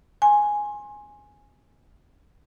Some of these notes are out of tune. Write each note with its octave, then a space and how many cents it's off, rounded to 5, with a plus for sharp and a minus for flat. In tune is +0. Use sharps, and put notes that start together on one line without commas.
G#5 +0 C6 +30